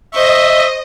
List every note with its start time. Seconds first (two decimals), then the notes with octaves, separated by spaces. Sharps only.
0.14 C5 D#5 E5 C#6